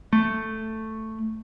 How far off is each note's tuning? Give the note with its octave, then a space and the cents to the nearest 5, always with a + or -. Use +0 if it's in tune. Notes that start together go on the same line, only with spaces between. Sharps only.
A3 +5